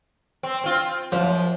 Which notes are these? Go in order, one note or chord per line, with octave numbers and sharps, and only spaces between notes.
C4
C4 F4
F#2 F3